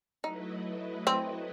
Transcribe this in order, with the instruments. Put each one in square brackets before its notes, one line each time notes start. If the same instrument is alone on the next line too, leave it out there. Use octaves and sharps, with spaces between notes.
[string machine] F#3 A3 E4 B4 D#5 [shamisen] D#4
[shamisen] C4